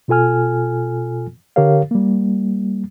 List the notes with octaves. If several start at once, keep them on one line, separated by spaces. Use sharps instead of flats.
B2 F4 A4 G#5 F6
D3 G4 A#4 C#5 F5
G3 A#3